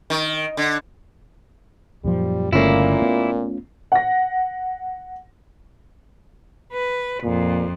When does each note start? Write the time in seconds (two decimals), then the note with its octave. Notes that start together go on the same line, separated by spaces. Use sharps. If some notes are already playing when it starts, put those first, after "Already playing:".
0.10 D#3
0.57 D3
2.04 F#2 A#2 F3 G3
2.53 G1 A#2 C#3 A3 A#3 C#4 E4 F4
3.02 B3
3.92 F#5 A#6
6.73 B4
7.24 F2 A#2